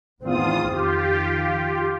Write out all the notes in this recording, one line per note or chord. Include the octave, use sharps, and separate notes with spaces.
E2 A2 D#3 C4 F4 D#6
F2 D#3 F4 G4